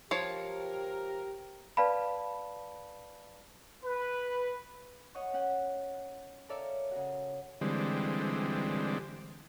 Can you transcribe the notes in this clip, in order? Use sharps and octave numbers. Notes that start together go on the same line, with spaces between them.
F3 G4 A#4 C#5
B4 D5 F5 A5 B5
B4
C#5 D#5 F#5 C#6
C#4 F#5 G5
A4 A#4 C#5 D5 E5 F5
C#3 F#4
D3 E3 G3 G#3 C4